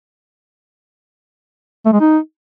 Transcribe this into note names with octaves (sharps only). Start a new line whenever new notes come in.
A3
G#3
D#4